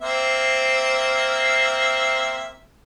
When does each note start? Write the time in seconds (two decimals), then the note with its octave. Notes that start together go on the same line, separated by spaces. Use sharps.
0.02 A#3 C4 E5